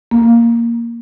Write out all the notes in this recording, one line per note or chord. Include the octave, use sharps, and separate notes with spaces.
A#3